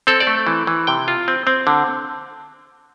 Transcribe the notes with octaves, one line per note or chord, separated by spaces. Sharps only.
C4 A4
D5
A3
E3
E3
C3 G5
F4
C4
C4
D3